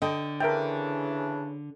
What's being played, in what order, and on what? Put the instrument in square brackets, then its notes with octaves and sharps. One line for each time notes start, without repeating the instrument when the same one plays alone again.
[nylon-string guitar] D3 [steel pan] D#5 G5
[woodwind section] C#3 E3 D4 [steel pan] A#4 E5 G5